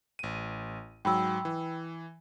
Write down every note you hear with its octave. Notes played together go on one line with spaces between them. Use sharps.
A1 D#7
G#2 F#3 G5 B5 E6
E3